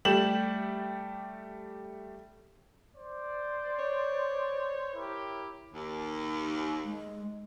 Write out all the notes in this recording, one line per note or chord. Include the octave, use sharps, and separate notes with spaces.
G3 A3 G4 E7 F#7
C5 D5
C#5
E4 G4 A#4
D#2
G#3